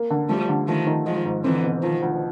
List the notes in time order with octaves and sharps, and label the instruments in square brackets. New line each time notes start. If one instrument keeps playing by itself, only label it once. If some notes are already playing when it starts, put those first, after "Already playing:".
Already playing: [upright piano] A#3
D3
[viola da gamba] F3 G3 [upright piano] A3
[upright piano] D3
[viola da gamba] D#3 F3 [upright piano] A3
[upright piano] D#3
[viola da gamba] D#3 F3 [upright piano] G#3
[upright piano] G#2
[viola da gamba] D3 E3 [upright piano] C4
[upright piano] B2
[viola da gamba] D#3 [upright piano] F3
[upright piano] D2